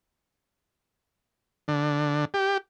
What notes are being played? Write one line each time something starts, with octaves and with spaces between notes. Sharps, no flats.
D3
G4